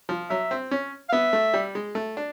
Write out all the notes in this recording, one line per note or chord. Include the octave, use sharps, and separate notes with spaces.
F3
F#3 E5
C4
C#4
F5
B3 E5
A3
G3
G#3
A3
D4